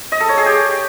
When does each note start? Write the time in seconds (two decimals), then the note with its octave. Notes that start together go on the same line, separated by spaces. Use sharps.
0.12 D#5
0.20 A4
0.29 C#5
0.38 G#4
0.46 G4